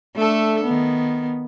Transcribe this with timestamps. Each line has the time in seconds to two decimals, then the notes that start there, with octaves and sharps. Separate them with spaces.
0.16 A3 D4 A4
0.64 D#3 B3